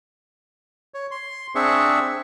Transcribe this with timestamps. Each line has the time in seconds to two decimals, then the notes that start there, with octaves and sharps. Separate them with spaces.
0.94 C#5
1.11 C6
1.55 C4 D4 G#4 E5 C#6